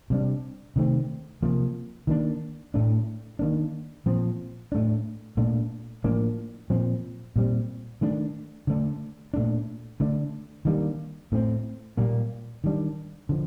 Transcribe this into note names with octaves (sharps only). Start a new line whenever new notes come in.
C3 G3 D4
C3 D#3 A3 C4
C3 F3 A#3
D#3 A#3 D4
A2 A3 D4
D#3 A#3 D4
A#2 F3 C4
A2 A3 D4
A#2 A3 D4
A2 F3 A#3 D4
A#2 F3 C4
A#2 G3 C4
D#3 A3 D4
D3 A3 D4
A#2 A3 D4
D3 A3 D4
D#3 G3 A#3 D4
A2 A3 C4
A#2 G3 A#3
D#3 G3 D4
D3 F3